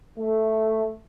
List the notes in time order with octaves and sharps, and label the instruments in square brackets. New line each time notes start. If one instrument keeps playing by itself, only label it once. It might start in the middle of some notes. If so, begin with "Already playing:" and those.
[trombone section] A3